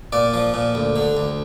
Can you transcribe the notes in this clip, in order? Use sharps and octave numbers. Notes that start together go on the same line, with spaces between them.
A#2 D5
F3
A#2
D2
D3
D2